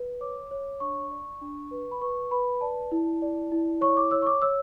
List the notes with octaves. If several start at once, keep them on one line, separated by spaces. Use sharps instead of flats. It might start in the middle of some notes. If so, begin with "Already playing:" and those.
Already playing: B4
C#5 D6
C#5
D4 C#6
D5
D4
B4
B5
B4 C#6
B4 B5
D5 A5
E4
D5
E4
C#5 C#6
D6
C#5 E6
C#6
D6
C#5 E6